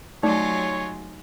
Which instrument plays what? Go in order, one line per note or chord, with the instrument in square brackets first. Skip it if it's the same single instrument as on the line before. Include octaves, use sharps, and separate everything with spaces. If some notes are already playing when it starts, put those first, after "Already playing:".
[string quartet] F#3 G#3 F4 [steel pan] A3 D5 [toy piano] D#4 [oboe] C#5